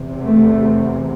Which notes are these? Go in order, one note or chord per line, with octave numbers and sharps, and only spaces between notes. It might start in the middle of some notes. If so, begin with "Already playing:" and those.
Already playing: E2 C3
A3